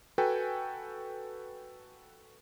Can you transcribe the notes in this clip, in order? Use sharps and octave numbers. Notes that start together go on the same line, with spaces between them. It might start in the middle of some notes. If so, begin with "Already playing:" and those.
F#4 A4 B4 G5 G#5